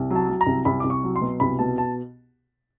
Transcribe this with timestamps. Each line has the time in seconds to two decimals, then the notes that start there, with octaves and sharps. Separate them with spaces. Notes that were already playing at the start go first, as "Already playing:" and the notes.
Already playing: C2
0.10 F#3
0.15 A5
0.29 F#3
0.41 A#5
0.47 C2
0.65 C2 B5
0.80 C2 D6
0.90 C#6
1.04 F#3
1.16 C6
1.21 B2
1.40 C2 B5
1.59 B2 A5
1.78 A5